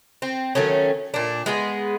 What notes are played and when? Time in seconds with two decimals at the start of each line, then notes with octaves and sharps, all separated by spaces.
0.22 C4
0.55 D#3 F#3 A3 C#4
1.14 A#2 D4
1.46 G#3 B3 G#4